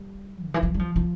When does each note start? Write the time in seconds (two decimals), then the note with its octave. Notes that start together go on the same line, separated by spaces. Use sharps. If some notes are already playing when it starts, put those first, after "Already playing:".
Already playing: G3
0.46 C#3
0.54 E3
0.63 F3
0.74 G3
0.79 F3
0.96 F3